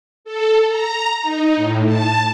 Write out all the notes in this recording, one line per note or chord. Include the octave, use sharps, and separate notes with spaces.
A4
A#5
D#4
A2
A5